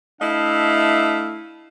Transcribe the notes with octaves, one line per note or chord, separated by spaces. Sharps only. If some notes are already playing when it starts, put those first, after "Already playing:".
A3 D4 E4 D#5 F5